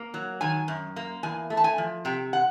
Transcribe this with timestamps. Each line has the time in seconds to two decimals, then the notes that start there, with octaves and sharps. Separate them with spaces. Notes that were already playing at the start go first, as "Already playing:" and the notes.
Already playing: A#3
0.14 F#3
0.41 D#3 G#5
0.68 F#2
0.96 A#3
1.23 E2 G#5
1.50 A3
1.57 A5
1.64 G#5
1.78 F3
2.05 C3 G5
2.33 F#5